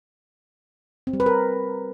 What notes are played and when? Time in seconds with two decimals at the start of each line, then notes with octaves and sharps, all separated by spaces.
1.07 C4
1.13 G3
1.20 B4
1.26 A#4